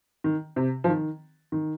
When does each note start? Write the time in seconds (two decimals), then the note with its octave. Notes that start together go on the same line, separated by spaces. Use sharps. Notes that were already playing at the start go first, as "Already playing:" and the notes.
0.24 D#3
0.56 C3
0.84 F3
0.88 D#3
1.52 D#3